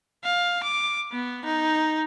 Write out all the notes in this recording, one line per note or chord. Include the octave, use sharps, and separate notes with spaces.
F5
D6
B3
D#4